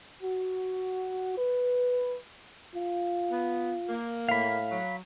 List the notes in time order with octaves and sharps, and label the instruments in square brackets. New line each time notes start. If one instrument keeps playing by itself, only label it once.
[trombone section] F#4
B4
[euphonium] F4
[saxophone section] B3
A#3
[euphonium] A2 [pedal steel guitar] F5 B5
[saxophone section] F#3